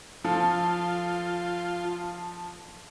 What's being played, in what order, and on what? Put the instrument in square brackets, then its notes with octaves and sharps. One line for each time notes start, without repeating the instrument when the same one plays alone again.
[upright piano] F3 A4 [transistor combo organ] F4